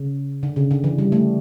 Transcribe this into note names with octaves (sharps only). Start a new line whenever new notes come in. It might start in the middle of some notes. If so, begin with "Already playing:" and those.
Already playing: C#3
D3
C#3
D3
E3
G3
A3